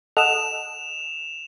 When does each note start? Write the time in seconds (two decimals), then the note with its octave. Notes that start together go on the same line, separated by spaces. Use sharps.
0.17 A4 D#5 F#5 E7 F7